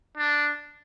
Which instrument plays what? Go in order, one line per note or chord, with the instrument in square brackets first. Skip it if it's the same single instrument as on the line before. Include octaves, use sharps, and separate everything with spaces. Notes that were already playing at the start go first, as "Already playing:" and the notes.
[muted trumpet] D4